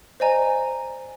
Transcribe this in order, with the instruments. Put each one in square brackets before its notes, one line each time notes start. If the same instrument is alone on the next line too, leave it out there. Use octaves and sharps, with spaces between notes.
[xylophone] C5 D5 D#5 G#5 A#5